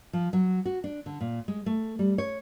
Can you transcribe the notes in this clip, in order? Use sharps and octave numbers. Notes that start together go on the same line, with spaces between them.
F3
F#3
F#4
D4
D3
A#2
G#3
A3
G3
C#5